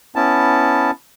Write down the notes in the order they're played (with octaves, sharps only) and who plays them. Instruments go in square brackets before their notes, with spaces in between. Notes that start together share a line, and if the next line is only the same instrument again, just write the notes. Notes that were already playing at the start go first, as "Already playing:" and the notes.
[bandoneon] B3 C#4 E4 A5